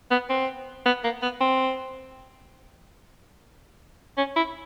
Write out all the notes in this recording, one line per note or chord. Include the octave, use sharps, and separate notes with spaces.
B3
C4
B3
A#3
B3
C4
C#4
E4